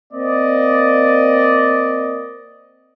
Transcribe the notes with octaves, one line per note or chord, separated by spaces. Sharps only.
A#3 C4 D5 D#5